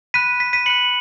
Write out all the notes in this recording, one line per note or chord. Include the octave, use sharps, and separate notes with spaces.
B5 F#6 B6 D#7
B6
B6 D#7
B5 F#6 C#7 F#7